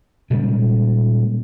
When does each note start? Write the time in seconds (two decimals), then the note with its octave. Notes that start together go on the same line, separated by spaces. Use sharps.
0.30 A#2 C#3 G3 G#3